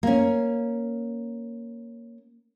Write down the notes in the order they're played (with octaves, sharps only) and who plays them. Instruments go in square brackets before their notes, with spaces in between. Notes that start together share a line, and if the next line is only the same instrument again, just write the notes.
[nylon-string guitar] A#3 C#4